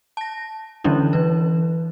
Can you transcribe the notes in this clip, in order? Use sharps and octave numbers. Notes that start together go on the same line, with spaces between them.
A5 A#6
D3 E3 F#3 C#4 D4 E4
E3 B4